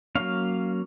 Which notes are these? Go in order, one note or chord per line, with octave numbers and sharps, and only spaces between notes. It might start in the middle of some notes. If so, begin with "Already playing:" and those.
F#3 A#3 C#4 F5